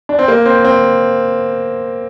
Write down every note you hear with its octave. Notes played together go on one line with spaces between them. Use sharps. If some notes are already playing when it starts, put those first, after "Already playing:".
D4
C4
A#3
C4
C4